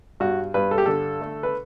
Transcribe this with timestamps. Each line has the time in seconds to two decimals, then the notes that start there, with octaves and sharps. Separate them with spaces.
0.20 G2 F#4
0.54 G2 B4
0.71 A4
0.78 G4
0.86 D3 A4
1.21 A3
1.43 B4